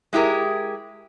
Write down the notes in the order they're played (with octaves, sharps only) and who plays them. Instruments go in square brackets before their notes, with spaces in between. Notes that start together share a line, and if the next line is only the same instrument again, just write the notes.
[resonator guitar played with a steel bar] G#3 E4 G4 G#4 A#4